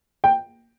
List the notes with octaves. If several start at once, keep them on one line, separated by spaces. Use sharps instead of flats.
G5